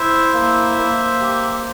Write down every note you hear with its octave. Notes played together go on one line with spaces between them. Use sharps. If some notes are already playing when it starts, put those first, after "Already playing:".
Already playing: E4 C5 E5
A#3
A#3
G4